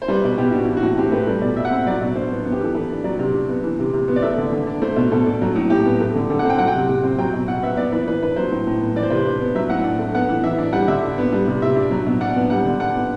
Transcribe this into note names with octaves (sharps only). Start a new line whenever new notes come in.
C5
G3 B4
B2
B2 G4
D4 F#4
E3 E4
F#4
A2
C4 G4
A3 B4
G3
B2 D5
B2 E5
F#5
C4 E5
F#3 D5
B2
D4 C5
B3
B3
G4
E3 A4
E3 B4
D4
F#3 D5
C3
D4
B3
E3
C3
C3
B3
D5
A3 E5
D3
D3
D4
A3 C5
B2
B2 A4
D4
F#3
A2
A2 G4
B3
A3
D3
D3 A4
F#5
C4
G5
F#3 F#5
G5
C3
C3
C4
F#3 G5
B2
B2 F#5
B3 E5
B3 D5
E3 B4
E3 B4
D4 B4
F#3 C5
A2
A2
B3
E3 D5
C5
C3 B4
C5
D4
B3
F#3 E5
A2 F#5
D4
A3
B3 F#5
E3
E3 E5
D4
G3 F#5
D3 E5
D4
B3
G3
C3
C3 E5
D4
F#3
B2
D4 F#5
B3
G3 F#5
D3
D4 F#5
B3